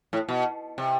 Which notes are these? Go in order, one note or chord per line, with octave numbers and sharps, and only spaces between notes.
A2
B2
C3